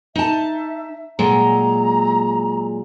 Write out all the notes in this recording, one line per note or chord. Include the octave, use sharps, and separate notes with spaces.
D#4 E5 A5
A#2 F#3 G#3 A#5